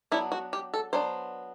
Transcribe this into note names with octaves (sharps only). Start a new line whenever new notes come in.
F#3 B3 D4 E4
F#4
G4
A4
F#3 B3 D4 C5